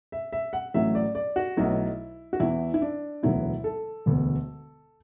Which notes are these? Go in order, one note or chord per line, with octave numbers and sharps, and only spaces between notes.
E5
E5
F#5
A1 A2 F#3 A3 E5
D5
D5
F#4
B1 B2 F#3 A3 E4
F#4
E2 E3 B3 E4
E4
D4
E1 D2 D3 F#3 B3 E4
A4
E1 D2 D3 B3